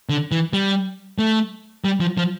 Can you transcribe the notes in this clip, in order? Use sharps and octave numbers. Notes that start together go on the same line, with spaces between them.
D3
E3
G3
A3
G3
F3
F3